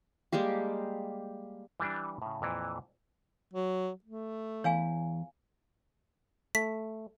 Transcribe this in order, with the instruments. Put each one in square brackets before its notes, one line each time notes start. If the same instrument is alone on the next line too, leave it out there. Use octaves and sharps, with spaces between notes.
[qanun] G3 G#3 A#3 G4
[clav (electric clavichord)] E3 G3 D4
A2 C#3
F2 A#2 E3
[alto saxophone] F#3
A3
[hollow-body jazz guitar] E2 E3 [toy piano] C#5 F5 G#5
[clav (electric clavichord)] A3 [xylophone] B6